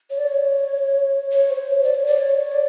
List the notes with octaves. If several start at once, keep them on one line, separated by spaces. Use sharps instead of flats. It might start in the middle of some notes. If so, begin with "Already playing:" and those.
C#5
D5
C#5
C#5
C5
C#5
D5
C#5
D5
C#5
D5